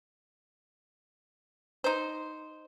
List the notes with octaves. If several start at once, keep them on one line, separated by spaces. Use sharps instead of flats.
D#4 C5